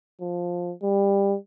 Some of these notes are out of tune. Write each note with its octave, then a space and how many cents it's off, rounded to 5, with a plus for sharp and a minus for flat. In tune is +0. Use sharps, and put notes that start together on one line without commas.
F3 +10
G3 +20